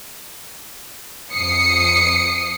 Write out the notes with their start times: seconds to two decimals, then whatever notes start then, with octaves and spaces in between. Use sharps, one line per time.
1.33 F2 D#6 C7 C#7